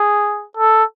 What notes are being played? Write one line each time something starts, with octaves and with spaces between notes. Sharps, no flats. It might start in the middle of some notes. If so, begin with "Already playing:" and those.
Already playing: G#4
A4